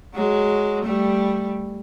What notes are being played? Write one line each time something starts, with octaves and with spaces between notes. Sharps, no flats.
F#3 G#3
G3 A3